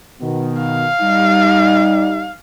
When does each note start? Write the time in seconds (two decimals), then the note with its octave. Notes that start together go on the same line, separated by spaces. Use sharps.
0.21 B2 D#3 B3
0.62 F5
1.01 G3 D#4